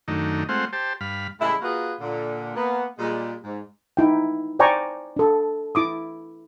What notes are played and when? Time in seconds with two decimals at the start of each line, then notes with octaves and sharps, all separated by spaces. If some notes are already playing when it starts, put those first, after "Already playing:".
0.08 F#2 D#3 A3 D4 D#4
0.49 G#3 A3 C4 F4 C5 F#5
0.73 G4 C5 A5
1.01 G2 F5 B5
1.40 A2 C#3 G3 G#3 E4
1.62 A#3 F4 F#4 G#4 B4 F5
2.00 A#2 D3
2.56 A#3 B3
2.99 A#2 G3 G#3
3.44 G#2
3.97 D#4 E4 G5
4.59 C5 D5 G5 G#5 A#5 C#6
5.16 D4 A4
5.75 E4 D6 D#6